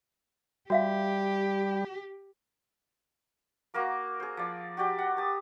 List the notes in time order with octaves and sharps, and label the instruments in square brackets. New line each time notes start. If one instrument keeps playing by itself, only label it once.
[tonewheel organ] G3 [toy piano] F#4 E5 F5 [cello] G4
[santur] A#3 F#4 A#4 D6
G#4 C5
F3 D5
F#4 G4 D5 G5
F#5
G4 A5 D#6